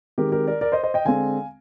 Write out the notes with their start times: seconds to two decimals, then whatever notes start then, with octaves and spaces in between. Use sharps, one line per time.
0.18 D#3 G#3 C4 G4 A#4
0.32 G4 A#4
0.47 A#4 D5
0.61 A#4 D5
0.72 C5 D#5
0.83 C5 D#5
0.94 D#5 G5
1.05 D3 G#3 C4 F5 G#5